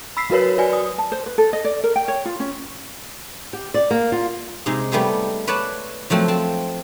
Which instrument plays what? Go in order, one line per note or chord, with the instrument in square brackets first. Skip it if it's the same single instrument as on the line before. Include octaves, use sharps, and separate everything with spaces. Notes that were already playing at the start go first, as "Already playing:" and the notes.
[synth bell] B5 E6 B6 C7
F#3 F#4 A#4 B4 C#5
F#4 B4 D5 G#5
D#6
[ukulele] A5
C5
B4
A4
D#5
D5
A#4
G5
C#5
F4
C#4
[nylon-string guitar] G4
D5
A#3
F4
[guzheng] C3 G#3 D#4 G#4
G3 A3 B3 G4 G#4
B4 C#5 D5 F#5 A5
F3 F#3 A3 C4
C4 A5